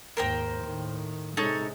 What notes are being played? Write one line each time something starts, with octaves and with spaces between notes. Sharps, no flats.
D#2 G#2 A#4 C5 G5
A2 D#3
C3 G#3 D#4 A4 C#5